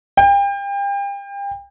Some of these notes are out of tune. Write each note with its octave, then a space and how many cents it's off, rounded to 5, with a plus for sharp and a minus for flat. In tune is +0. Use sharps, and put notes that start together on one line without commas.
G5 +35